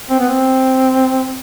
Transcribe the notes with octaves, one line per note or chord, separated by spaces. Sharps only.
C4
B3
C4